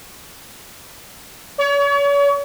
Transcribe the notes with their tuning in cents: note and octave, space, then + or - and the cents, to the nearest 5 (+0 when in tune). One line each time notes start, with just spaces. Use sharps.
C#5 +40